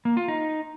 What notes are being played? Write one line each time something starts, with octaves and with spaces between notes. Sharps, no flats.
A#3
F4
D#4